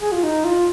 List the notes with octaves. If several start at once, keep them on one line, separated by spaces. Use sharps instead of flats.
G#4
F4
D#4
F4